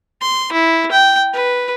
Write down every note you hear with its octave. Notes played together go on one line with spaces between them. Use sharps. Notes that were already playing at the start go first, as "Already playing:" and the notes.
C6
E4
G5
B4